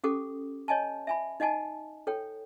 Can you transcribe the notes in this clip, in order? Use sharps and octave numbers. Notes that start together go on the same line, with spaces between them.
C#4 G4 A4 F#5 D6 D#6
C#5 D#5 G#5 A5
E5 G#5 B5
D#4 D#5 F#5 G#5 A5
A4 C#5 G5